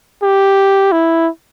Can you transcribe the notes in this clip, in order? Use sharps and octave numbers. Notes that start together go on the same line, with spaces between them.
G4
E4